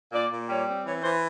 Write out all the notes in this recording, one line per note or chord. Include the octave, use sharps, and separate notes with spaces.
A#2 D5
A#2
G3 C#5
C4
E3 C#5
E3 C5